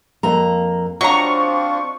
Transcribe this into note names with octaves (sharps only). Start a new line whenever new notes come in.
F2 A#3 A#5
F#3 C4 D4 F4 D#5 A#5 C#6